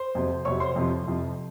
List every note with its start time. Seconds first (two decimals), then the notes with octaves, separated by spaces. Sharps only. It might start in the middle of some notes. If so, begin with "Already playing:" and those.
Already playing: C5 C6
0.15 F2 C3 F#3
0.45 F2 C3 F#3 C#5 C#6
0.60 C5 C6
0.75 F2 C3 F3
1.06 F2 C3 F3